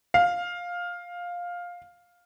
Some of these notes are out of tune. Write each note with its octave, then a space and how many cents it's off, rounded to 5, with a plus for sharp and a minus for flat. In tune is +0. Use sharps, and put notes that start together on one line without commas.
F5 +10